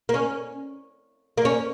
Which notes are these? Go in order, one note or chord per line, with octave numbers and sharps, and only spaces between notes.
A#3
C#4
A#3
C#4